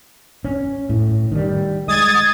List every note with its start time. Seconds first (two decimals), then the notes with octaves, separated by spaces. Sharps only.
0.45 C#4
0.89 A2
1.32 D#3 G3
1.88 G#3 D#6 G#6 A6